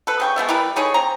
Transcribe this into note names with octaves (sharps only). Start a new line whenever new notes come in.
A4 B4
C#3 G5 C#6
G#3 A3 B3 E5
G3 E4 A#4 B4
A3 D#4 G#4 C#5
C4 A#5